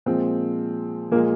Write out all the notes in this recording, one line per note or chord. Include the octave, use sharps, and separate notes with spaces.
A#2 F3 G#3 C4
A#2 F3 G#3 A#3